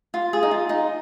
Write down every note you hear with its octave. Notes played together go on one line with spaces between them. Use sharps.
F4
G#4
D#4
F4
D#4